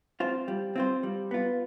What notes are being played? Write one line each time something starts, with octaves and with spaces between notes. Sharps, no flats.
C4 F4 C5
G3
C4 F4 C5
G3
B3 F4